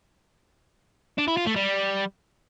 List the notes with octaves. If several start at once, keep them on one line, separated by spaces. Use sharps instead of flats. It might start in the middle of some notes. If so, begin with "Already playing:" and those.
D4
E4
F4
A3
G3